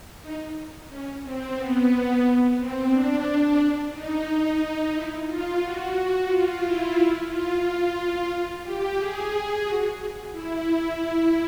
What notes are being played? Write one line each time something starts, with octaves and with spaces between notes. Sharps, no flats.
D#4
C#4
C4
B3
C4
D4
D#4
D#4
D#4
E4
F4
F#4
F4
E4
E4
F4
F4
G4
G#4
F#4
E4